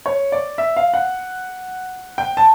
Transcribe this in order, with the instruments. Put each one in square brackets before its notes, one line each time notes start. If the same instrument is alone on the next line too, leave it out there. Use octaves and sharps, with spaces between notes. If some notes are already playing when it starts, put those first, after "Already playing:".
[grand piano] C#5
D5
E5
F5
F#5
G5
A5